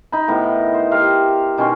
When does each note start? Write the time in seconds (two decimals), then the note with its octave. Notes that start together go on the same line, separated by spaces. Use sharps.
0.12 D#4 B5
0.28 A2 D#3 B3
0.74 C5
0.91 G4 A#4 E5 F5
1.58 B2 D#3 C#4 C6